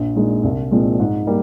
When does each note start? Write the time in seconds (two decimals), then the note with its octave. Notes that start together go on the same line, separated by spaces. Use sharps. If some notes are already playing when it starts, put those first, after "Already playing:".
Already playing: A#1
0.16 A#2 G#3 D#4
0.44 C2
0.71 A#2 F3 G#3 C4
1.00 G#2
1.27 G3 A#3